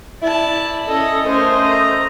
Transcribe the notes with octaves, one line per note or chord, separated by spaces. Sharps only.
E4 D5 A5
C#4 A4 D#5
A3 C#4 A#4 C5 D#5
A#5